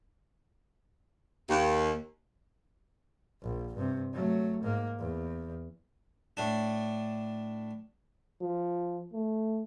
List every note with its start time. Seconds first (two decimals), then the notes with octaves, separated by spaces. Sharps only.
1.49 D#2
3.42 A#1
3.75 G2 C3
4.13 F#3 A3
4.63 G#2 A#3
4.99 E2
6.37 A2 D4
8.41 F3
9.13 A3